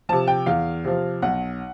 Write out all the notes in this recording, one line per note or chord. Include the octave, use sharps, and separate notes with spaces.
C3 F3 A5
G5
E2 F5
C3 F3
B1 F#5